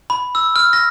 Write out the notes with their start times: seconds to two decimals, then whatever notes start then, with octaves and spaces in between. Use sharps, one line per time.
0.10 B5
0.35 E6
0.56 F6
0.73 A#6